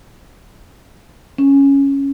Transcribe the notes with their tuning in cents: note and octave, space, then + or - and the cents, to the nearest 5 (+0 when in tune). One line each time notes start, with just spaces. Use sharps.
C#4 +0